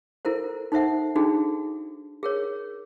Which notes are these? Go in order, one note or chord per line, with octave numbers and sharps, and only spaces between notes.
E4 A4 A#4 C5
D#4 A4 C5 E5 F#5
D4 D#4 F#4 G#4 A4
G#4 A#4 C#5